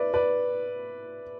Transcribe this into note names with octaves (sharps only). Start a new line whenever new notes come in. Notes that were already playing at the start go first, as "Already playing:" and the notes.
Already playing: B4 D5 E5
B4 D5